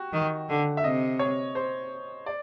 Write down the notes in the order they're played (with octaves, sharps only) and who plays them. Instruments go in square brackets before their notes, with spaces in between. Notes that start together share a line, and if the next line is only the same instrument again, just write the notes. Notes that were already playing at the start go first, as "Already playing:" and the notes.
Already playing: [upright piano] F#4 G4
[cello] D#3
D3
[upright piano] E5
[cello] C3 [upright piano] D#5
[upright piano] C#5
C5
D5